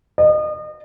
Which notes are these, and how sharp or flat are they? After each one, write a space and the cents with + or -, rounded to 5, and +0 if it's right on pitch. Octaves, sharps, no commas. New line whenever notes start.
D#5 -35